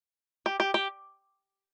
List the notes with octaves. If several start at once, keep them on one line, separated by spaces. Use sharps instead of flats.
G4
G4
G4